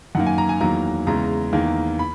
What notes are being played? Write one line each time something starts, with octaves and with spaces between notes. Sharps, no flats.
F#2 D#3 A#3 F#5
G#5
A#5
G#5
E2 D#3 F#3 A#3 A#5
E2 C#3 G#3 A#5
E2 D#3 A#3
B5